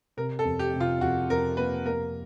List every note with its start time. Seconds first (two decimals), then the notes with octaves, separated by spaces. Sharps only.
0.17 C3 A#4
0.39 A4
0.45 F2
0.59 G4
0.74 C3
0.80 F4
1.01 F2 F#4
1.29 F2 A#4
1.57 A#3 B4
1.85 A#3 A#4